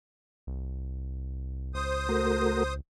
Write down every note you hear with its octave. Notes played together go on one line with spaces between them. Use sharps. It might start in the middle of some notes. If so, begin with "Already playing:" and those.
C2
C#2 C5 D#6
A3 F#4 A#4